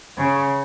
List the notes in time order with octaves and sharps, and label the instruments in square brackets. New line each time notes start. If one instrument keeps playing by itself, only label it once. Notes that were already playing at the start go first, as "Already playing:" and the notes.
[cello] C#3